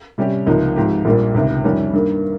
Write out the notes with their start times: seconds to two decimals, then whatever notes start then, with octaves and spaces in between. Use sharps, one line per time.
0.18 C3 G3 C#4 G4
0.47 C#2 C3 F3 A#3 D#4
0.76 G#2 F3 C4 G4
1.05 A#1 A#2 G3
1.34 C#2 C3 D#3
1.64 F2 D#3 G3 C#4
1.93 G2 D#3 A#3